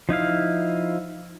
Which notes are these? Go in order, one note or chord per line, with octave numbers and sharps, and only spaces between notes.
F3 D#4 E4 F5